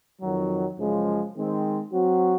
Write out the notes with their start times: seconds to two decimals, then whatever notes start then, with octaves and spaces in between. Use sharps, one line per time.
0.20 F2 D#3 F#3
0.77 F#2 C#3 F3 G#3
1.35 D#3 G#3 C4
1.92 F#3 C4 F#4